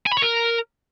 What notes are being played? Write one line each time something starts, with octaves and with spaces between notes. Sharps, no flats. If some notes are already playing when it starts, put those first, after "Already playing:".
G#5
B5
C#5
A#4